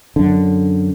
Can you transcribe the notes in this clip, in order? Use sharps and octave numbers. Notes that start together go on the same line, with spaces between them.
F#2 D3